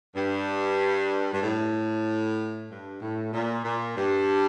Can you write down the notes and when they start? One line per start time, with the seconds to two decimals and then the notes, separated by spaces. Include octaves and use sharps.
0.15 G2
1.33 G2
1.42 A2
2.70 G2
3.01 A2
3.33 A#2
3.64 A#2
3.96 G2